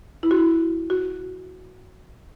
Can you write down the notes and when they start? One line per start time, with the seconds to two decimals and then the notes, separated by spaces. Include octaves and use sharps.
0.23 E4
0.31 F#4
0.38 E4
0.90 F#4